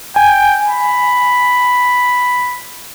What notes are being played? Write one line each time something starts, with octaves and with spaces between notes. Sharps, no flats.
G5 G#5
B5